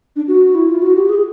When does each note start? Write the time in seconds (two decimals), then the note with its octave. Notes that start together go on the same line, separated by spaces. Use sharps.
0.16 D4
0.28 F#4
0.55 E4
0.68 F4
0.82 F#4
0.96 G4
1.09 G#4